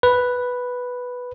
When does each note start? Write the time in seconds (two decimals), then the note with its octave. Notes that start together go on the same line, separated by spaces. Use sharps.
0.03 B4